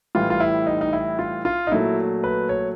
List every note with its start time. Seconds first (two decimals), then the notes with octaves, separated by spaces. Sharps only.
0.15 A2 E3 G3 F4
0.30 F4
0.40 E4
0.67 D#4
0.81 D#4
0.93 E4
1.19 F4
1.45 F4
1.67 D#4
1.72 A#2 F#3 A3 E4
2.24 B4
2.49 C#5